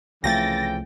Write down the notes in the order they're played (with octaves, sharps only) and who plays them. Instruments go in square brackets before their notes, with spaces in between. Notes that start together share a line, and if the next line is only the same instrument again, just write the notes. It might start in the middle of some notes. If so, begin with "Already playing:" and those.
[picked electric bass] C2 F3 A3 [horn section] C#3 E3 G5 [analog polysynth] A6 A#6